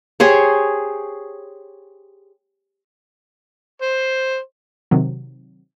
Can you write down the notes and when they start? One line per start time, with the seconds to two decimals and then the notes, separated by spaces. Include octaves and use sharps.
0.20 G4 G#4 C5 C#5
3.82 C5
4.91 C3 D#3 F#3